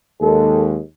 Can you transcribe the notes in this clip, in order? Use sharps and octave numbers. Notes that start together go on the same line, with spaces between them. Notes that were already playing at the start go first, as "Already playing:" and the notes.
D#2 G#3 A4